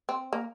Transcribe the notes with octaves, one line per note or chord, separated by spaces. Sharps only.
C4
A#3